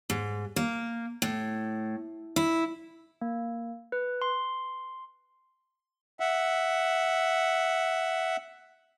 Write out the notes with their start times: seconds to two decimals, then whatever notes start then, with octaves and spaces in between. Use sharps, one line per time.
0.10 G#2
0.56 A#3
1.22 A2
2.36 E4
3.22 A#3
3.92 B4
4.22 C6
6.20 E5 F#5